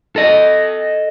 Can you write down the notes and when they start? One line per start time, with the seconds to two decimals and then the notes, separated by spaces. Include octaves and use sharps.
0.16 A4 D#5